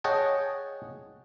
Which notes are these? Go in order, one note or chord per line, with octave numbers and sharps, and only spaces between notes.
G#4 C#5 D#5 F#5 G5 A5